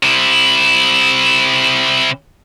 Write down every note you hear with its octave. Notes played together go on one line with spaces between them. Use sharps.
C3 E4